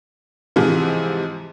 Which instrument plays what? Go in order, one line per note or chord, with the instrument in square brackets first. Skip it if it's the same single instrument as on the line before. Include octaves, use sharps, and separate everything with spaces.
[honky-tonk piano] G#2 C3 E3 F3